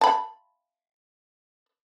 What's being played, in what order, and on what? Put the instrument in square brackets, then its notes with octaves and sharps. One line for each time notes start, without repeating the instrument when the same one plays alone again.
[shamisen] A5 B5